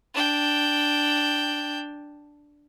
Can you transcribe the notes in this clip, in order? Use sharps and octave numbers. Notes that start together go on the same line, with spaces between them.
D4 G5